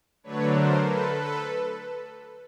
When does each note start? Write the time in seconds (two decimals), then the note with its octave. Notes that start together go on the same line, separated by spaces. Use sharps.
0.23 D3 F#3 A3 D4 B4 C#5
0.53 A#4 C5
0.84 A4 B4
1.15 A4 B4